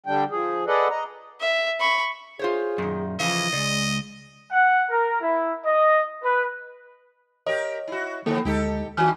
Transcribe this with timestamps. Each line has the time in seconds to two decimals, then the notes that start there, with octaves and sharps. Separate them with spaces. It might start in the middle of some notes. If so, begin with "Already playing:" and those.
0.06 D3 G3 D4 G5
0.31 F3 G#4
0.67 G#4 A4 B4 D5 D#5 F#5
0.90 D#5 A#5
1.41 E5
1.80 B5 C#6
2.39 F4 G#4 C5 C#5
2.78 F#2 A#2 D#3
3.20 A2 C#3 E3 F3 D#5 F5
3.53 C#2 G#3 D5
4.51 F#5
4.89 A#4
5.21 E4
5.64 D#5
6.22 B4
7.46 G4 A#4 C#5 D#5
7.88 E4 F#4
8.26 D3 F3 A#3 B3 A4
8.45 D2 G#3 D#4 G4 A4
8.97 G2 D#3 A#3 F#4 F6